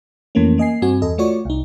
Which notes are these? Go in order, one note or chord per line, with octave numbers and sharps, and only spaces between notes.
F2 E3 A3 A#3 C#4
A#3 D#5 G#5 C7
G2 C4 F#4 G#5
E2 A4 D#5
A3 F4 F#4 C#5 D5 C#6
C2 D#4